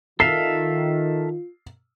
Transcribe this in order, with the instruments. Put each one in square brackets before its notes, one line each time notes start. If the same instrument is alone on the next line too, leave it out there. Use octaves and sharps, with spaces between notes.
[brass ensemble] D#3 [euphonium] F4 [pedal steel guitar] A4 E5 F5 [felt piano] C7